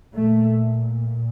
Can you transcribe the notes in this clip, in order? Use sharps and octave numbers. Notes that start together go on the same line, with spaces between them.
A#2 A3